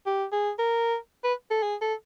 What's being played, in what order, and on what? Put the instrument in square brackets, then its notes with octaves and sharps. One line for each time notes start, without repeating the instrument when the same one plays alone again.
[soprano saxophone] G4
G#4
A#4
B4
A4
G#4
A4